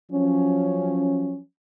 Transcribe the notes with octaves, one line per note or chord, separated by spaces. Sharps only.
F3 F#3 C#4